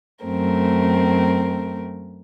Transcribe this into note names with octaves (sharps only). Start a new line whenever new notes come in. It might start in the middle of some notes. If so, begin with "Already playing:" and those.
F#2 A3 C4 A#4